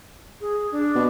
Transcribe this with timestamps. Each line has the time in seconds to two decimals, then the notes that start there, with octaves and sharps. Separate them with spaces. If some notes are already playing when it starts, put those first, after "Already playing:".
0.41 G#4
0.72 D4
0.96 B2